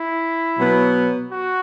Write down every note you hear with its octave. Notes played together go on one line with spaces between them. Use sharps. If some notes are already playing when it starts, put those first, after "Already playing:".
Already playing: E4
B2 F#3 B3
F#4